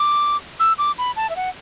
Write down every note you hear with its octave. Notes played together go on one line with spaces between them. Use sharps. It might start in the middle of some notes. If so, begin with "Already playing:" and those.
Already playing: D6
E6
D6
B5
A5
E5
F#5